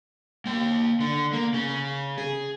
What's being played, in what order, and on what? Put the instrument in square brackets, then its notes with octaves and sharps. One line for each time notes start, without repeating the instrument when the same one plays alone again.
[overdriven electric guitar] A#3 G5
D3
A#3
C#3 C#4
G#4